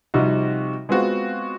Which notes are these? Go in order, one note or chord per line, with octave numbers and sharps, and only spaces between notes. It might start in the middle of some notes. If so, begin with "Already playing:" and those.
C3 F3 G3 C4 D#4 F#4
G#3 B3 C4 F4 F#4